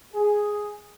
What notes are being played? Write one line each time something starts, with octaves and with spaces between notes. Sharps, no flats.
G#4